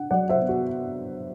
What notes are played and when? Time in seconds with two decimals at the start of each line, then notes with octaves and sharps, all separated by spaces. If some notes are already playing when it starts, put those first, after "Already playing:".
Already playing: D4 F#5
0.11 F#3 D5 F#5
0.29 C5 E5
0.40 B3
0.49 F#4